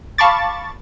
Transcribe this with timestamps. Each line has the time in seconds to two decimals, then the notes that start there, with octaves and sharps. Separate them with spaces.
0.18 F5 A5 B5 C#6 D6 A6